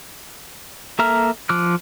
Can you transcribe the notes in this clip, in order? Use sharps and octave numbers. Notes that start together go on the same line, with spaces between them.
A#3 A4 E5 A#5 F6
F3 D6 F6 F#6